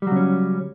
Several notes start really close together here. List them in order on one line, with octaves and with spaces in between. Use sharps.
G3 F#3 C#3 C#4